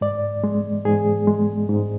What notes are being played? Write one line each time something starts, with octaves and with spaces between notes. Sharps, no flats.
G#2 D5
G#3
G#2 G#4
G#3
G#2